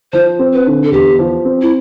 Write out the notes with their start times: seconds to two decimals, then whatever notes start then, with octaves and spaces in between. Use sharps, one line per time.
0.13 F3 C5
0.39 C4
0.53 B4
0.66 D3
0.84 A4
0.92 E2 G4
1.19 F3
1.45 C4
1.62 E4